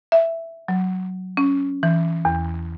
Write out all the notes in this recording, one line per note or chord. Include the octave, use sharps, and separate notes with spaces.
E5
F#3
C#4
E3
E2